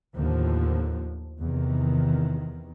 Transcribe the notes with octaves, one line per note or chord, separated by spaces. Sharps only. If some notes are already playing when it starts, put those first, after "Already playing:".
D#2 A2 D3 F3
E2 C3 D#3